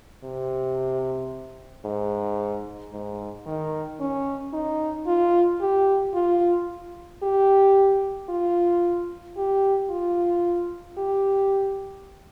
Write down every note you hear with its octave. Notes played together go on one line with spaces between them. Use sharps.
C3
G#2
G#2
D#3
C#4
D#4
F4
G4
F4
G4
F4
G4
F4
G4